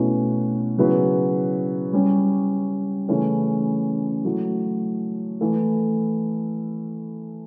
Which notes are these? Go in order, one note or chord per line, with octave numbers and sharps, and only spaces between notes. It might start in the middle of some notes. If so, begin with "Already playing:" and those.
Already playing: B2 A3 C#4 E4 B4
C#3 F#3 B3 E4 B4
G3 C#4 G4
C#3 E3 A3 C#4 E4
F#3 A3 E4
E3 A3 E4 A4